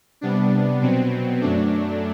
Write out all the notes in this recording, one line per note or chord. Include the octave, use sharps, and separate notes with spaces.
C3 G3 B3 D4
B2 F#3 B3 C4
F#2 F#3 A3 D4